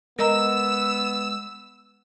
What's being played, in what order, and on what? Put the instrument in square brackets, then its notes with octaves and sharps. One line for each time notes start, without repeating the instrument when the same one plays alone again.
[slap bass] G#3 [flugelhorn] B3 [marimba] A#4 D#5 A#5 [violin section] E6